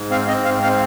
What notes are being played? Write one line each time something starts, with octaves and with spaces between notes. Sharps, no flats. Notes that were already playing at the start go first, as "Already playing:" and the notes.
Already playing: G#2
C4 F5
C4 D#5
G#2 F5
C4 F5